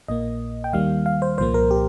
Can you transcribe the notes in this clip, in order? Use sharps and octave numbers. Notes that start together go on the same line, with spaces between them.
A#1 A#2 A#3 D#5
G5
D#2 D#3 G3 A#3 F5
F5
C5
C2 A#2 F3 A#3 C5
A#4
G4